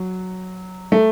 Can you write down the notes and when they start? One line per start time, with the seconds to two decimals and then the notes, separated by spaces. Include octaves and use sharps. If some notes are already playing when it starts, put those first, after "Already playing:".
Already playing: F#3
0.92 A3